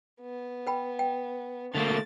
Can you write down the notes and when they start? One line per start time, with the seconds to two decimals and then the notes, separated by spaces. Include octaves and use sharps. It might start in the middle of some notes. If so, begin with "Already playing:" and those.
0.21 B3
0.67 B4 G5 B5
0.99 G5
1.75 D3 A3 A#3 A6